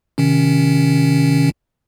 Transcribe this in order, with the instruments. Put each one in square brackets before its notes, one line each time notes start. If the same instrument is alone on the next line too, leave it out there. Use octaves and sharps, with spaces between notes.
[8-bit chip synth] C3 D#3 C#4